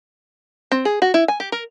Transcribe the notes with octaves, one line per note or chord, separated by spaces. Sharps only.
C4
G#4
F#4
E4
G#5
G4
A#4